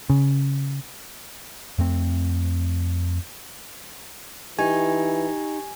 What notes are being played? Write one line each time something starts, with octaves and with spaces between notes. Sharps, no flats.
C#3
F2 A3 C4
E3 D#4 G4 G#5